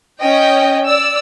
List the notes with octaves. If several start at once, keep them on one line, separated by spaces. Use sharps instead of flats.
C#4 D#5 G5
D5 E6